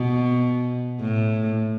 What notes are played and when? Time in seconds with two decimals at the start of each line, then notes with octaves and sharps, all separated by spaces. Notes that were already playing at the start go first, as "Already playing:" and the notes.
Already playing: B2
1.01 A2